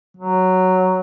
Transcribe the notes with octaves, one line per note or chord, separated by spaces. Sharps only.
F#3